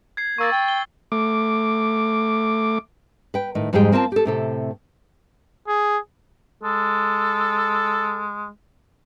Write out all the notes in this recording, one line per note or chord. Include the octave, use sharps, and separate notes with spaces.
G#6 C7
A#3 C#6 E6 A6
G5
G7
A3 D6
B4 G5
A2 D#3
F2 G#2 G3 G4 G#4 G5
A#3 C4 F4 G#5 A5
G4 A4
A2 C3 A4
G#4
G#3 A4